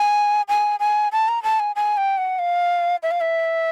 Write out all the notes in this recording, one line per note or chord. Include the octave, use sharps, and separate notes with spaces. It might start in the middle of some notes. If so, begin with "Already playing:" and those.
Already playing: G#5
G#5
G#5
A5
A#5
A5
G#5
G#5
G5
F#5
F5
E5
F5
E5